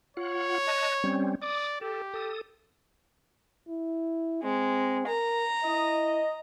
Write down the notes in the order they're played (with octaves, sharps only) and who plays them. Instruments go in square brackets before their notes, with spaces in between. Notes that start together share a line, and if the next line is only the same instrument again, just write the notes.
[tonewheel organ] F4 F#5 [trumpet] C#5
[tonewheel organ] D#5 A5 F#6
G3 C4 C#4
[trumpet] D5 [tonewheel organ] D6 D#6
[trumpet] G4 [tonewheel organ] A4
[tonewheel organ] A4 D#6
[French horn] E4
[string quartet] G#3 [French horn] C4
[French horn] A#4 [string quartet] A#5
[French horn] E4 [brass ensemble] D#5